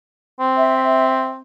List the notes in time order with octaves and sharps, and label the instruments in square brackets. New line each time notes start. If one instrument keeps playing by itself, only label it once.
[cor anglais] C4
[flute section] E5